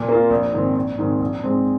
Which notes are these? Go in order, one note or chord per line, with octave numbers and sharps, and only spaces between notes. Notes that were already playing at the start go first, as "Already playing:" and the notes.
Already playing: A#2
A#3 F4
A#1
G#2 D#3 C4
A#1
G#2 D#3 C4
A#1
G#2 G#3 C4